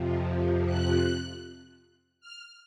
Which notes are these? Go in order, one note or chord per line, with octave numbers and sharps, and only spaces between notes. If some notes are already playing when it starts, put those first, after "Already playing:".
Already playing: F2 C3 F3
F#6
F6